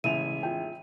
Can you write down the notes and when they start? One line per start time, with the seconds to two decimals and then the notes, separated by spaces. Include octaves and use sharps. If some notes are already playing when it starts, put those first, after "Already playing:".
0.04 A1 D#2 C#3 G#3 E4 E5 D#7 F7
0.43 F4 G5